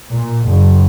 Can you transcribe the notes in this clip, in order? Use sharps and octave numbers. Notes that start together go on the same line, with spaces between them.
A#2
F#1